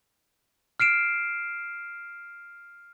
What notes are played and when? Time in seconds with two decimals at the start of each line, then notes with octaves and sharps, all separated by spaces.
0.80 F6 C7 D7 E7